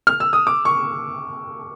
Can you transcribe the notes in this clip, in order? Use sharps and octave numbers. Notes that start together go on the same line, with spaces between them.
F6
E6
D#6
D6
C#6